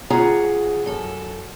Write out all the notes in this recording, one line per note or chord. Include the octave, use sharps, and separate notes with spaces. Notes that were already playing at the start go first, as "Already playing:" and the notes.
D2 C#4 F4 G#4 F#5 A#5
F#2 A4